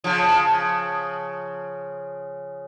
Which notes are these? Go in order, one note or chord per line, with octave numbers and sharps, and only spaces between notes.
C#3 F3